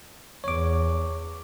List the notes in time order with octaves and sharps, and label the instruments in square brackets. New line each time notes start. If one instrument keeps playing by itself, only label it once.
[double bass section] E2 [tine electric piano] C#5 D6